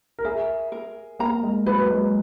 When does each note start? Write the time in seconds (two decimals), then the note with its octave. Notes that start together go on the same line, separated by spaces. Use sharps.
0.19 A#4
0.25 G#4 E5
0.72 A#4
1.19 A#3 A#5
1.43 G#3
1.66 F#3 B4
1.91 G#3